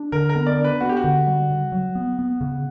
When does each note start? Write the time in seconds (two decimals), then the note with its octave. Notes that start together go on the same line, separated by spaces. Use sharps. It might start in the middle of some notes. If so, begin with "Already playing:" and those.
Already playing: D4
0.12 D3 A#4
0.29 A#4
0.35 B3
0.47 D5
0.58 D4
0.64 B4
0.80 B3 F#4
0.89 G4
0.97 F#4
1.04 D3
1.27 G3
1.50 C#3
1.72 F#3
1.95 B3
2.19 B3
2.41 C#3